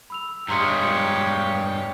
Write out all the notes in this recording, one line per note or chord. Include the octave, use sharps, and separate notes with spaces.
B5 E6 F7
G2 G#3 G4 C#5 A#5 C6 C#7